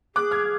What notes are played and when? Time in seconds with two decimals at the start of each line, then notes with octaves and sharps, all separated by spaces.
0.15 G#4 D6 F#6
0.31 F6 G#6